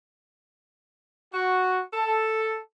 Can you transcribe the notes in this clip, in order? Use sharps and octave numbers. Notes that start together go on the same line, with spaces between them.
F#4
A4